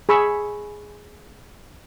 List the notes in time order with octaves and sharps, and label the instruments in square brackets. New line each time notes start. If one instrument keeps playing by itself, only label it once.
[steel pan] G#4 B5 C#6 E6